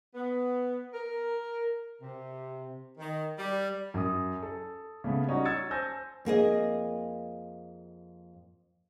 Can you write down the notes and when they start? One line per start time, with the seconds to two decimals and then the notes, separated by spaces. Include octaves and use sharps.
0.15 B3
0.94 A#4
2.02 C3
2.98 D#3
3.38 G3
3.94 F#2 D#6
4.43 A4
5.04 C#3 A3 B3
5.27 G3 C#4 D#4 F#4
5.45 E6 G#6 A6 C#7
5.71 C5 G#5 A5 E6 G6 A#6
6.25 F2 A#3 G#4 D#5